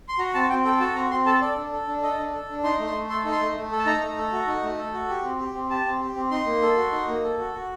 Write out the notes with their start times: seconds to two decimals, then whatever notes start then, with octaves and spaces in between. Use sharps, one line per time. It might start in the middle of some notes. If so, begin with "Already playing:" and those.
0.09 C6
0.19 F#4 A#5
0.34 C4 A5
0.50 C4 G5
0.65 A4 G5
0.80 F#4 A5
0.95 C4 A#5
1.10 C4 C6
1.26 A4 A5
1.41 A4 D5
1.56 D4
1.72 A4
1.88 D4
2.02 A4 D#5
2.18 D4
2.33 A4
2.49 D4
2.64 D#4 C6
2.79 A3
2.87 C6
2.94 A3
3.09 A4 C6
3.25 D#4
3.32 C6
3.41 A3
3.55 A3
3.71 A4
3.79 A5
3.86 D#4 A#5
4.01 A3
4.17 A4
4.32 F#4
4.47 D#4
4.63 A3
4.78 A4
4.93 F#4
5.09 G4
5.23 C4
5.39 G4
5.55 C4
5.69 G4 A5
5.86 C4
6.00 G4
6.15 C4
6.31 D#4 C6
6.46 A#3
6.62 A4
6.77 F#4
6.92 D#4
7.08 A#3
7.23 A4
7.39 F#4
7.53 F#4